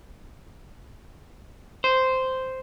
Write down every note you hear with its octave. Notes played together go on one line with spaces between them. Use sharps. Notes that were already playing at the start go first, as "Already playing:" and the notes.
C5